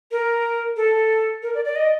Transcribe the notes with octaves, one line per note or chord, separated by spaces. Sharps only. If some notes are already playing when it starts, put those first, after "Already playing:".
A#4
A4
A#4
D5
D5
D#5